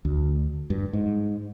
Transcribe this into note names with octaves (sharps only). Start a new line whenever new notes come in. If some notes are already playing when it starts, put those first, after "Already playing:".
D2
G2
G#2